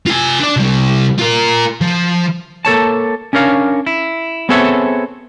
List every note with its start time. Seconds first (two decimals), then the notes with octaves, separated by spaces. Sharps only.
0.07 F4 G#5
0.40 D4 D5
0.56 C3 G3
1.19 F4 A#4
1.81 F3
2.65 A#3 A4 C#5 A5
3.33 C#4 D4 A#4 C#5 F5
3.86 E4
4.49 B3 C4 G#4 A4 C#5 E5